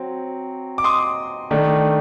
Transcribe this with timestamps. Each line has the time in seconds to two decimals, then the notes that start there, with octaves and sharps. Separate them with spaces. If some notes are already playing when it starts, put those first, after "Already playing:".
Already playing: F#3 C4
0.78 D6
0.84 C6 D#6
1.51 D#3 A3 D4